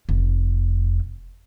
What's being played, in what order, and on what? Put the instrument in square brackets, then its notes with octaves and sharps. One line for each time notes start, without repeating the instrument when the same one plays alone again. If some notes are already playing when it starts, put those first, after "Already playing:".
[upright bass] F1